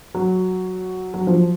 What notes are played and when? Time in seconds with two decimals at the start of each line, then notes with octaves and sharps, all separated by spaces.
0.15 F#3
1.14 F#3
1.27 F3